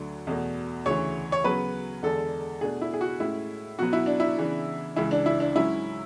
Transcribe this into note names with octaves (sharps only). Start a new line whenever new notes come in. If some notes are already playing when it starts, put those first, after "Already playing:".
Already playing: D2 D3 F#3 A3 D4
E2 B2 A3
D2 C#3 E3 C#5
C#5
C#3 F#3 B3 B4
E2 D3 G#3 A4
B2 A3 D4 G#4
E4
G#4
F#4
A2 G#3 C#4 E4
B2 F#3 B3 F#4
E4
D4
E4
C#3 E3 B3 D4
C#2 C#3 E3 E4
D4
E4
D4
G#2 F#3 C#4 E4